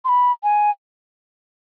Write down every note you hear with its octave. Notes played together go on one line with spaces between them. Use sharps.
C6
B5
G#5